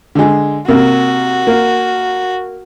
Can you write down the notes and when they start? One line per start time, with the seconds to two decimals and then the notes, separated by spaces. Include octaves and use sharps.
0.15 D3 G#3
0.68 C3 A#3 F#4
1.47 A#3